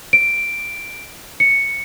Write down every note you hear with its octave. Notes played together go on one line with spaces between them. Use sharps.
D7
C#7